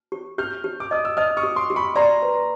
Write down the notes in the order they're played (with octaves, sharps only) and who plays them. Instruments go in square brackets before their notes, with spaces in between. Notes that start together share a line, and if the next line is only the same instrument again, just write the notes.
[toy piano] G4
[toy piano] G4 [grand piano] F6 G6
[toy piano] G4
[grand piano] D6
[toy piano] D#5 [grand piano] D#6
[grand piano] E6
[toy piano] D#5 [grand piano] D#6 F6
[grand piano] C#6 D#6
[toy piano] G4
[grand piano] C6 D6
[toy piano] G4
[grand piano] B5 C#6
[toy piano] D5 [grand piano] A#5 C6
[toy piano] B4